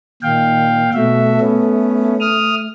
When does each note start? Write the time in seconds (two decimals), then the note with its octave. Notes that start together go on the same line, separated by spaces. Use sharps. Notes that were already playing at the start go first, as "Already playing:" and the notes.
0.22 A#2 D#3 F5 G5
0.94 B2 A3 F#4 E5
1.41 B3 C#4
2.20 D#6 F6